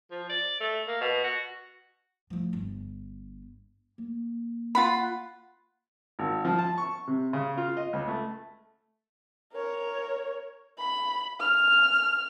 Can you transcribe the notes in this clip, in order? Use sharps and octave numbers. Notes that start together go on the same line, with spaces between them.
F3
D5
A3
A#3
B2
F#4
A2 F3
G1
A#3
F4 F#5 B5
G#1
F3
A5
C#6
C3
C#3
F4
D#5
C#2
A3
A#4 C#5
B5
F6